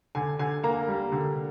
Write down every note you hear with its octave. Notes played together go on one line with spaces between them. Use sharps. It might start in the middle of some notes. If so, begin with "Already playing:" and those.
D3 G#5
D3 G#5
A#3 A#5
G3
D3